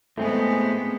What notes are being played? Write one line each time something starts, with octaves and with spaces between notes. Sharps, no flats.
A2 G#3 A3 B3 C4 G#4